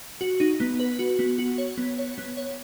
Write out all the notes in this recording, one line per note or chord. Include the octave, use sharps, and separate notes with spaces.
F#4
D#4
B3
B4
F#4
B3
F#4
C#5
B3
C#5
B3
C#5